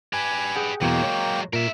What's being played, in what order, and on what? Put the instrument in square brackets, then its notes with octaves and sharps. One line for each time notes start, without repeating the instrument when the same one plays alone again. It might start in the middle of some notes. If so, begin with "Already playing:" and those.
[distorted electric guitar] G4 B4 [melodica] G#5
[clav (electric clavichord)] G#4 F#5 G5
[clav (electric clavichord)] E2 B2 [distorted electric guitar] F#3 G#3 [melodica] A#3 G5
[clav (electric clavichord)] C#5
[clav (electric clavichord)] A#2 [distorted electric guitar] A#4 E5